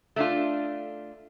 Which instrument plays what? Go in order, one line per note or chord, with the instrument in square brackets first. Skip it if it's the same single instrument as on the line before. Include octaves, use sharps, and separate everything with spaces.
[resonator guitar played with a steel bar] A3 D4 F4